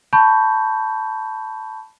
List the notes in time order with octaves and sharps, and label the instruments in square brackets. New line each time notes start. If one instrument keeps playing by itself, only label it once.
[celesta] A5 B5 C#6 G6